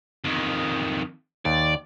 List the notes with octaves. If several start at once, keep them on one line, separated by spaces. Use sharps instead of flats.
F2 D#3
D#2 D5